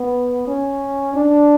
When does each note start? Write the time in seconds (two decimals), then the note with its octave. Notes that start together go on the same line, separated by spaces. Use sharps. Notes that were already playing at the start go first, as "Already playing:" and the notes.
Already playing: B3
0.48 C#4
1.15 D4